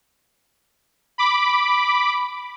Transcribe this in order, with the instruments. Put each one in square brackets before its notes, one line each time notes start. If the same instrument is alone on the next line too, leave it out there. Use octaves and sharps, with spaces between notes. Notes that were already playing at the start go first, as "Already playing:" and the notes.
[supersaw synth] B5 D6